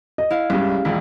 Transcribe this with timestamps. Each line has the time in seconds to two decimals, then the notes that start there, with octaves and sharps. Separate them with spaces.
0.18 D#5
0.30 E4 F5
0.50 C2 G2 G#3 C#4 G4
0.85 E1 A#1 G#2